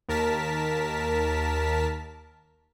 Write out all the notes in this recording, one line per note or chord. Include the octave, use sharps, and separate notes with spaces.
D#2 A#4 A5 B6